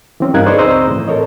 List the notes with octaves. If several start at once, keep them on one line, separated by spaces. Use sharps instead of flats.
E3 C4 C#4
G2 D#4 A#4 F5 F#6 G#6
G#4 B4 C5 D5 D#5 C#6
C#2 C4 C5 D#5 A#5 E6
A2 E3
A4 A#4 C#5 D#5